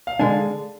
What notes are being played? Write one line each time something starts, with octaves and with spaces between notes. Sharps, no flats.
F5
D3 G#3 D4 G#5